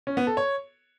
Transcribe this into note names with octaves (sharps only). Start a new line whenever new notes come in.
C#4
B3
A4
C#5